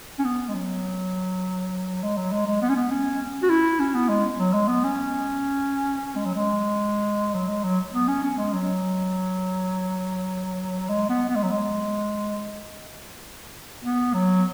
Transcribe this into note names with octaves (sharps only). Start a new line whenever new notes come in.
C#4
B3
G#3
F#3
G#3
F#3
G#3
G#3
B3
C#4
B3
C#4
F#4
E4
C#4
B3
G#3
F#3
G#3
B3
C#4
G#3
F#3
G#3
F#3
G#3
F#3
B3
C#4
C#4
G#3
F#3
G#3
B3
B3
G#3
F#3
G#3
B3
F#3